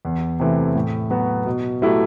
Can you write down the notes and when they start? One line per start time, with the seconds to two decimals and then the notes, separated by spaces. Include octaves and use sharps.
0.05 E2
0.40 C3 E3 A3
0.75 A2
1.10 F#3 B3 F#4
1.46 B2
1.82 F#3 A3 E4 G4